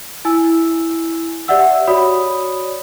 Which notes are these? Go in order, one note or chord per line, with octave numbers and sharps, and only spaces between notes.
E4 G#5 E6
G4 D5 E5 F#5 E6
F#4 C#5 D5 B5 D#6